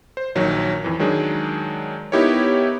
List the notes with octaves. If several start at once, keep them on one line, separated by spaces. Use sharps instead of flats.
C5
A#1 D#3 F#3 C#5
F2 E3
D#3 F#3 G#3 D4 G#4
B3 D#4 E4 G4 A#4 C#5